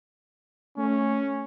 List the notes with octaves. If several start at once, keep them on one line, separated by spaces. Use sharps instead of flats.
A3 C#4